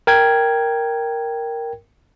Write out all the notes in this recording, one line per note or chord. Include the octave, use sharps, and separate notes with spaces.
A#4 G5 G#6